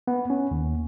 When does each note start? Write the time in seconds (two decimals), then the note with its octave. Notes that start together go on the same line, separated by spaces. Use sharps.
0.08 B3
0.30 C#4
0.51 D#2